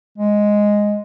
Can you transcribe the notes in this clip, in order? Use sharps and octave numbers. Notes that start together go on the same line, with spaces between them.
G#3